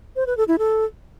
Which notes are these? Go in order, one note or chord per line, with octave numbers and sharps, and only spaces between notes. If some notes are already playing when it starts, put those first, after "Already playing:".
C5
B4
A4
E4
A4